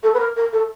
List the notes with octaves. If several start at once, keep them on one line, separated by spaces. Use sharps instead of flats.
A4
B4
A#4
A#4
A4